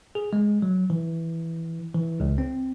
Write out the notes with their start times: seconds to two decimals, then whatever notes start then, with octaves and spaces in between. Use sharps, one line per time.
0.15 G#4
0.33 G#3
0.62 F#3
0.90 E3
1.95 E3
2.20 C#2
2.38 C4